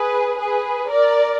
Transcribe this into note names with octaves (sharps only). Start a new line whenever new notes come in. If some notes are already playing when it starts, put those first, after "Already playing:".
Already playing: G#4 B4
G#4 B4
A#4 D5